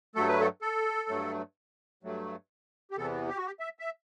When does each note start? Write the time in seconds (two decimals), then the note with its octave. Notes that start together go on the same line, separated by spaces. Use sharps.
0.15 G2 F#3 A3 A4
0.28 B4
0.40 A4
0.62 A4
1.09 G2 F#3 A3
2.03 G2 F#3 A3
2.91 G4
2.97 E2 C3 E3 B3 A4
3.28 G4
3.37 F#4
3.46 G4
3.60 E5
3.79 E5